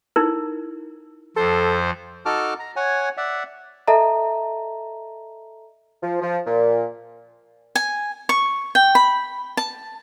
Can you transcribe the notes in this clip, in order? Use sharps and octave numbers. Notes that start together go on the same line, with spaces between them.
D#4 E4 A#4
F2 A4 C5
D#4 F#4 A4 A5 D6 F6
A#5
C#5 F#5 G#5
D5 E5 F#5
A4 D#5 E5 A5 A#5
F3
F3
A#2
G#5
C#6
G5
B5
A5